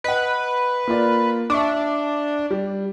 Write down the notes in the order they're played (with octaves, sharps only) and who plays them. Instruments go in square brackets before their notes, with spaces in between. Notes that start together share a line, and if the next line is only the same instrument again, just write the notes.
[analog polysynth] B4 [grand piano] D#5 F#5
[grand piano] A#3 F4 D5
[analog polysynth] D4 [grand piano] E5 C#6 D6
[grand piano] G3